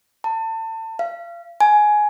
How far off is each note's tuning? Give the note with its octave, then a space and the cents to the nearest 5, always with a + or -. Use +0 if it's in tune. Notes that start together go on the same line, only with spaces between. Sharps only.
A5 +30
F5 -35
G#5 +15